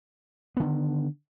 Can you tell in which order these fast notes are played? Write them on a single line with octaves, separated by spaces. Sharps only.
B3 D3 D#3